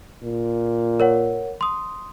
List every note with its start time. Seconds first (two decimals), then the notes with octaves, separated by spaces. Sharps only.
0.23 A#2
1.00 A#4 C#5 F#5
1.61 C6 D#6